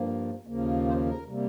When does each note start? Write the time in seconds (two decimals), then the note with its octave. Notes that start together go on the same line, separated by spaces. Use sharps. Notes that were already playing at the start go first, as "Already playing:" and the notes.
Already playing: G2 F3 A#3
0.47 D#2 C#3 F3 A#3
0.87 C5
1.06 A#4
1.26 C3 G3 A#3